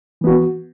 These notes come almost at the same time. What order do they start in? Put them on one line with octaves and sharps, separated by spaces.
E3 B3 F#4